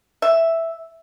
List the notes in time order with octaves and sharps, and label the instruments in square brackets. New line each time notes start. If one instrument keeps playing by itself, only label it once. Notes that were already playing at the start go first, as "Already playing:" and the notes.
[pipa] E5